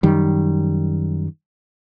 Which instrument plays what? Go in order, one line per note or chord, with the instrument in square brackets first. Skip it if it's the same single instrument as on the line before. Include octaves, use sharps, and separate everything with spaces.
[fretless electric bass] F#2 D#3 G3